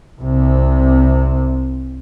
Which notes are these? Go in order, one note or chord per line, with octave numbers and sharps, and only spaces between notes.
C2 C3